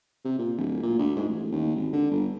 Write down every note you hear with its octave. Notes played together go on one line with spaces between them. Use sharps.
C3
A#2
D1
A#2
D2
G#2
A1
D#2
G#1
D3
G1